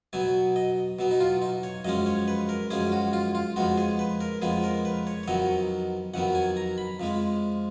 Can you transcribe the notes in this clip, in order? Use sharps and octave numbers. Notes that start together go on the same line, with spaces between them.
B2 F#3 B3 G#5
D#5
B2 F#3 B3
D#4
F4
D#4
C#5
F#2 F3 G#3 C#4 D#5
C#5
B4
A#4
F#2 F3 G#3 C#4 G#4
F#4
F4
F4
F2 F3 G#3 B3 F#4
G#4
B4
A#4
F2 F3 G#3 B3 G#4
A#4
B4
C#5
C#5
F2 D#3 F#3 B3 D#5
F2 D#3 F#3 B3 F#5
G#5
A#5
B5
F2 F3 G#3